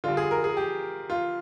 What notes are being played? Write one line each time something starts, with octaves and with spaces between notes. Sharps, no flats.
D3 G3 F4
G#4
A#4
G#4
G4
F4